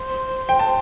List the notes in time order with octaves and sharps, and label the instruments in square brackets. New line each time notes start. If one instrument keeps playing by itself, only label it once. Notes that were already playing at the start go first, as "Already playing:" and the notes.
Already playing: [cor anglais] C5
[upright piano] G5
A5